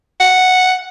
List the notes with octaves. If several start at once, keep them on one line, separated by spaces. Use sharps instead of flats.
F#5